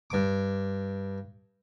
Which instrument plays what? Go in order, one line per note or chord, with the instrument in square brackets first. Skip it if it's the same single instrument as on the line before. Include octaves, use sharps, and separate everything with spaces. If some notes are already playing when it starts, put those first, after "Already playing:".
[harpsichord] G2 D6